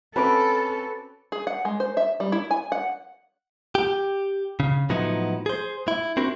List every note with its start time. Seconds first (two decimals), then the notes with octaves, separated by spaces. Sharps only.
0.16 C4 C#4 F#4 A4 B4 D6
1.32 G#4
1.47 F#5
1.65 G#3
1.80 C5
1.97 E5
2.20 G3
2.32 E4
2.51 G#5
2.72 F#5
3.75 G4
4.60 C#3
4.89 A2 F3 F#3 B3 D#4 E4
5.46 G#4 C5
5.88 E4
6.17 C4 D4 E4 F#4 A#4